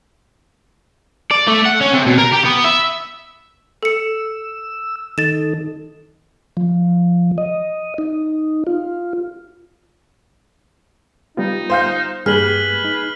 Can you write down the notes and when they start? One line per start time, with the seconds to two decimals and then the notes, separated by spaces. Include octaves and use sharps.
1.31 D5
1.48 A3
1.66 F#5
1.81 C#4
1.93 C3
2.07 B2
2.18 A#4
2.33 G4
2.45 B3
2.65 E5
3.83 A4 E6 C#7
5.18 D#3 D#4 A4 A6 E7
6.57 F3
7.38 D#5
7.98 D#4
8.67 F4
11.37 G3 B3 D#4 F4
11.70 C5 F5 G6
12.26 G2 G3 A#3 G#4 B4 F6 F#7
12.85 D#4